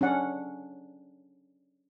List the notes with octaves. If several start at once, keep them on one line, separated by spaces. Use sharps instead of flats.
C#4 D4 F#5